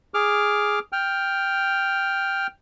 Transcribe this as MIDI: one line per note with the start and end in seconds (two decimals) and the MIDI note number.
0.14 0.79 68
0.14 0.79 86
0.14 0.79 89
0.92 2.47 79
0.92 2.47 89